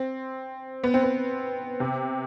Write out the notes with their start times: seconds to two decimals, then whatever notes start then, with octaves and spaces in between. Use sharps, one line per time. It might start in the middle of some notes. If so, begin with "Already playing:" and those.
Already playing: C4
0.84 B3
0.94 C4
1.03 B3
1.80 C3